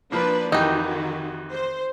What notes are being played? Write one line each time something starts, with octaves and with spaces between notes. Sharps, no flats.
F3 A#3 D4 B4 D5
F2 D#3 E3 D#4 F#4 G4
C5